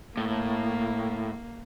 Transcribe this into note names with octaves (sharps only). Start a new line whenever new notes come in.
A2 A#3